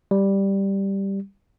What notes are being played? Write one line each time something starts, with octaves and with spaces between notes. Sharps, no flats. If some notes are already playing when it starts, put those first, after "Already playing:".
G3